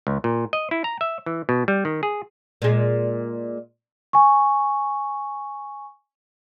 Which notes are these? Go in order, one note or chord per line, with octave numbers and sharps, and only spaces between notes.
C#2
A#2
D#5
E4
A#5
E5
E3
B2
G3
D#3
G#4
A#2 G#3
G#5 C#6